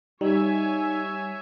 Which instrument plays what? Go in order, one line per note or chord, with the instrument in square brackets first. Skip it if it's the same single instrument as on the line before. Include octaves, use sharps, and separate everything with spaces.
[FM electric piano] G3 [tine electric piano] D#4 [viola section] C#5 E5 G#5